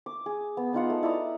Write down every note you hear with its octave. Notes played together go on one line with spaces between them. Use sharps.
D6
G#4
B3
B3 D#4 F4 F#5
A3
E4 D5 A#5 D#6